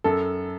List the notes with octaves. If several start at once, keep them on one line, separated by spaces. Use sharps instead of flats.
F#2 A4